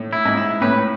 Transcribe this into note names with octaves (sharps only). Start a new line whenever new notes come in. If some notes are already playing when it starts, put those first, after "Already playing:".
Already playing: A2
E4
G#2
E4
A2 B4